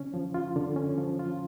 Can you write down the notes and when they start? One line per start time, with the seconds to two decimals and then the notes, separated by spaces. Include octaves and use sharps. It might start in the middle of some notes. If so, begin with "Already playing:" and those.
Already playing: D3 C#4
0.14 F3
0.34 F4
0.56 D3
0.76 C#4
0.98 F3
1.19 F4